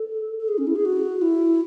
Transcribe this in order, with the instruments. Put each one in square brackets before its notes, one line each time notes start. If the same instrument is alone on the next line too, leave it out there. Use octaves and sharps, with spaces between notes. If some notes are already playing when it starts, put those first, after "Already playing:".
Already playing: [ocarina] A4
A4
G#4
C#4
E4
G#4
F#4
E4